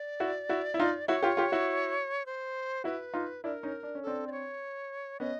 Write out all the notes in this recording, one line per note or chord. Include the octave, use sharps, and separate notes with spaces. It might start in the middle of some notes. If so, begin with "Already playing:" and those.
Already playing: D5
E4 F#4
E4 F#4
E4
D#4 F4
E4 F#4 C#5
F4 G4
F4 G4
E4 F#4
C5
E4 F#4 B4
D#4 F4
D4 E4 A#4
C#4 D#4
D4
C#4
C4 D4 A4
D5
C#5
B3 C#4 D#5